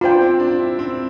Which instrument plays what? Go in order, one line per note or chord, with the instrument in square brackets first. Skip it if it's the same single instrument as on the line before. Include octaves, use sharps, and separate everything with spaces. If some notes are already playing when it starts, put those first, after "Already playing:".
[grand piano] D4 [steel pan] F4 C5 G5
[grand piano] C4
D4
E4
C4